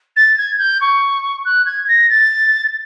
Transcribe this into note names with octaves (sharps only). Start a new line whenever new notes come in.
A6
G#6
G6
C#6
F#6
G#6
A#6
A6